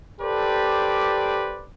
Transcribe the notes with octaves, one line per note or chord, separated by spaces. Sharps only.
G4 A4 B4 C5 D5